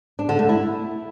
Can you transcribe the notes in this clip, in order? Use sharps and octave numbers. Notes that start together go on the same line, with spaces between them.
D4
D3
A3
E4